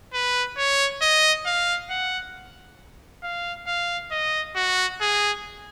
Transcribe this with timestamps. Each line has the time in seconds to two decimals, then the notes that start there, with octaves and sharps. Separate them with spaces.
0.14 B4
0.58 C#5
1.02 D#5
1.46 F5
1.90 F#5
3.23 F5
3.67 F5
4.11 D#5
4.56 F#4
5.01 G#4